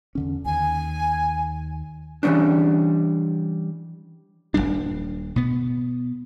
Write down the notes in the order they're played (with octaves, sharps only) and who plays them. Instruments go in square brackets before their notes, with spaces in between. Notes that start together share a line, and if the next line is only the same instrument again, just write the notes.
[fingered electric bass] E2 D3 C#4
[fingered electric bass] D#2 [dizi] G#5
[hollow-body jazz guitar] E3 G3 G#3 C#4 D4
[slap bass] D#1 D#2 G3 D4
B2 B3